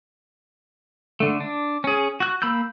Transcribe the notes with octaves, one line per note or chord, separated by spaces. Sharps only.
D3 A3
D4
C#4 G#4
F#4 F#6
A#3 B5 E6 G6